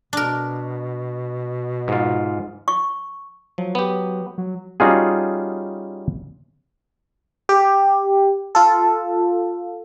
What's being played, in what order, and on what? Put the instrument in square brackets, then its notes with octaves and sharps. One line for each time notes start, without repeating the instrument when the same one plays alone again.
[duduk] B2 [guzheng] D4 A#4
[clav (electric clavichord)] G#2 F4
[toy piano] C#6
[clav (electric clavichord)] F3 [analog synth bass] F#3
[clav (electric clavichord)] B3 G4
[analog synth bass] F#3
[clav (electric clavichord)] G3 C#4 D#4 F4 F#4 G#4
[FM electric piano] G4
F4 A4